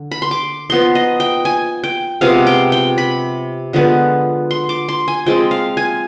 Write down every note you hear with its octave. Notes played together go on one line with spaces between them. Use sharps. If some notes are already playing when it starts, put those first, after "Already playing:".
Already playing: D3
B5
C6
D6
F3 B3 D#4 C6
D#5
G5
G#5
G5
C3 F3 G#3 B3 F5
G5
G5
B5
D3 F3 G#3 B3
C6
D6
C6
G#5
F3 G#3 C4 G5
F5
G#5